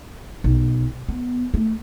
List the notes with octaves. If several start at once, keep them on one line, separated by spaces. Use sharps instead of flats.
B1
B3
A3